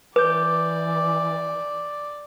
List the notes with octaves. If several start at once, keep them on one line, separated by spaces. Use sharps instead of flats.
E3 B4 D5 D6 G6